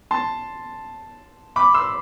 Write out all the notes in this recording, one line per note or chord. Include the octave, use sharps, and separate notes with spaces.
A5 C6
B5 D6
C6 E6